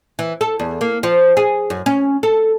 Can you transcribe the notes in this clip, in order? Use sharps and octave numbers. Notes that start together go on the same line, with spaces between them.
E3
A4
E2
A#3
F3
G#4
F#2
C#4
A4